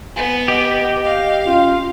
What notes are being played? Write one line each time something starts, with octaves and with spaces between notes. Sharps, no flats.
B3 G#5
G4 D#5
F5
C#4 F4